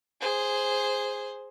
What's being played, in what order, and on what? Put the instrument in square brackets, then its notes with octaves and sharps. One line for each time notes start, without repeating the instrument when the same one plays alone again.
[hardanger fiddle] G#4 C5